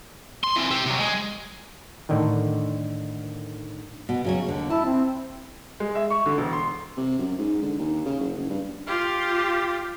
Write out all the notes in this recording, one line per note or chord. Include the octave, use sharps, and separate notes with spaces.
C6
E3 C4
G4 E5
C3 F#3
G#3
A2 D3 D#3
B2
C#3 F#3 C#5
D#2 D3
E4 A5
C4
G#3
E5
C#6
D3
E1
C6
C3
F#2
G#2
D3
D#2
C#3
F#1
F#1
G2
F4 G4